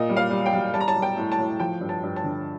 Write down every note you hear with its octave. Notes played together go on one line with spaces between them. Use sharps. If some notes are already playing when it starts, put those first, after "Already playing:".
Already playing: A#2 D#5
G3
F5
G3
G5
G3
G3 A5
A#5
A5
G3
G5
A2
A5
A2
F3 G5
G2
A5
G2
A5
D3